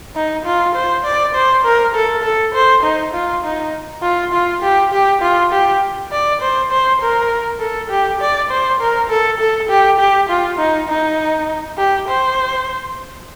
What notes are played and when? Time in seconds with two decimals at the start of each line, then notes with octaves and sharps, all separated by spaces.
0.16 D#4
0.45 F4
0.75 C5
1.05 D5
1.34 C5
1.65 A#4
1.95 A4
2.23 A4
2.54 C5
2.83 D#4
3.14 F4
3.43 D#4
4.03 F4
4.33 F4
4.62 G4
4.92 G4
5.22 F4
5.51 G4
6.12 D5
6.41 C5
6.71 C5
7.01 A#4
7.60 A4
7.90 G4
8.21 D5
8.50 C5
8.80 A#4
9.10 A4
9.40 A4
9.69 G4
9.99 G4
10.29 F4
10.59 D#4
10.89 D#4
11.78 G4
12.08 C5